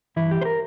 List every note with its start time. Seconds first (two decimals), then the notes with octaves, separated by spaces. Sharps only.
0.16 G2 E3 E4
0.31 G4
0.41 C5
0.45 A#4